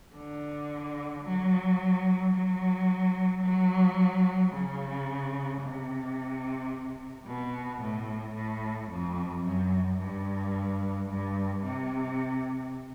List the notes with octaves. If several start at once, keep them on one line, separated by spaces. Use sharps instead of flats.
D3
F#3
F#3
F#3
C#3
C3
B2
A2
A2
F2
F#2
G2
G2
C3